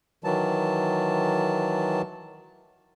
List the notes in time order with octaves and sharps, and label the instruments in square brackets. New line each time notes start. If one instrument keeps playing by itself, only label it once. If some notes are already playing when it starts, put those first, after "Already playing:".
[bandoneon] D#3 E3 F#3 A5